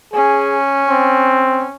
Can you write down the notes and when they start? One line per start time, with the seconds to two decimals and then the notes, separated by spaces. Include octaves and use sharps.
0.14 C#4 G#4
0.87 C4